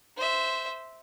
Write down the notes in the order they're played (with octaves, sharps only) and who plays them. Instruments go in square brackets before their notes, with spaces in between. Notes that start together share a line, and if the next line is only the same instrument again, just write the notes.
[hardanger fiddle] C5 E5